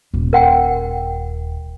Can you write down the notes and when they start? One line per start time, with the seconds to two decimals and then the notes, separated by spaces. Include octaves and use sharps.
0.14 D#1
0.33 A#4 F#5 G5